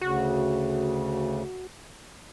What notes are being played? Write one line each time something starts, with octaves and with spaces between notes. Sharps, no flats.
D2 C#3 F#4